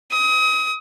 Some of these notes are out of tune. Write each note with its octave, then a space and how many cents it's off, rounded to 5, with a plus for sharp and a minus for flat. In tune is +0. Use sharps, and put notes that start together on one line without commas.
D#6 +30